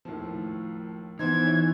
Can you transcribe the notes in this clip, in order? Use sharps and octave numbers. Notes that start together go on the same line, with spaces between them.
D#2 A2 F3
E3 B3 D#4 C5 D#5 G#6
E4 C#5 E5